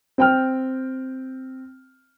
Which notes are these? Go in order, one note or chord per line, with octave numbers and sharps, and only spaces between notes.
C4 G5 F6